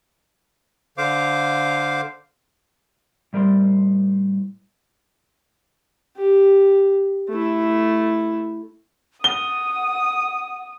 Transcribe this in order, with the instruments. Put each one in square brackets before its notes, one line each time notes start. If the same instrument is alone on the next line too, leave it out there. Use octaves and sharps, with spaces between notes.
[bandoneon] D3 C5 F5 D6
[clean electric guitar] A2 G3 A#4 C5 C6
[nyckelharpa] G4
A3 E4
[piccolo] F#5 [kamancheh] D#6 [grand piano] G7